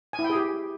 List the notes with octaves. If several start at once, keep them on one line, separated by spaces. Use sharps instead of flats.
G#5
E4
G5
G#4
G4